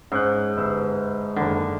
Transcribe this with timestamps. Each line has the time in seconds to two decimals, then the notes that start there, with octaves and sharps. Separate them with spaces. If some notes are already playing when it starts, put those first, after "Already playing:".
0.12 G#2 C#4 F#6
0.57 G1 E6
1.36 F#1 D3 D#3